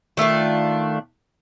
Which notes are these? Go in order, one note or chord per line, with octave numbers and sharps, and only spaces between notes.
D#3 A3 D4 F4